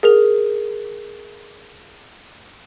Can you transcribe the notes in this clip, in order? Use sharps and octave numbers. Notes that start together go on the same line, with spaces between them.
G#4 A#4 F7